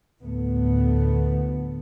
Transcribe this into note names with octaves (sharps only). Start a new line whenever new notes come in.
D2 A2 A3 B3